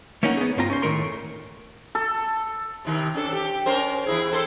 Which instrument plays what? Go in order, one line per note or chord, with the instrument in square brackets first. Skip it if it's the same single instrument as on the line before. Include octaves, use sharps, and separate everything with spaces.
[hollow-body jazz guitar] A3 A#3 C#4 D#4 A#4 F#5
B3 G#4
C2 G2 C4 F4 A#5
C#4 C5
A2 D#3 A3 A#4 C6
[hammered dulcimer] A4
[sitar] C3 D#3 A#4
C#4 D4 A4
G4
C#4 A#4 C5
E2 E4 G#4
C4 A4 C5